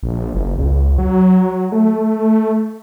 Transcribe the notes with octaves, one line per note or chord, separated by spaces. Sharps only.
A#1
F#1
C#2
F#3
A3